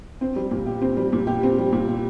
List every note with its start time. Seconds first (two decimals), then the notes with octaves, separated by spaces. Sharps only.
0.21 C4
0.36 G3
0.51 A#2
0.66 G4
0.82 C4
0.97 G3
1.13 A#2
1.27 G4
1.43 C4
1.58 G3
1.73 A#2
1.88 G4